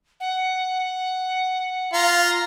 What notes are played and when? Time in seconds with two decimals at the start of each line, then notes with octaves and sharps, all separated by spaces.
0.20 F#5
1.93 F4 A#5